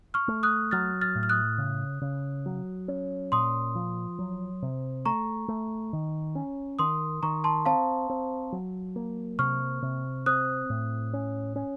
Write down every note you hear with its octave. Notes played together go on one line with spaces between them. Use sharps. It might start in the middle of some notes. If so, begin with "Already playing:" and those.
C#6 F6
A3
D#6 F#6
F#3 F6 A6
F6 A6
A2
F6
D#6 F#6
C#3
C#3
F#3
C#4
A#2 C6 D#6
F3
F#3
C3
A3 A#5 C#6
A3
D#3
C#4
D#3 C6 D#6
D#3 A#5 C#6
A5 C6
C4 F5 A5
C4
F#3
A#3
C3 C#6 F6
C3
C4 D#6 F#6
A2
C#4
C#4